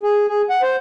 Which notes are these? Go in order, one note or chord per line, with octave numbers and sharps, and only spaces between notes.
G#4
G#4
F#5
C5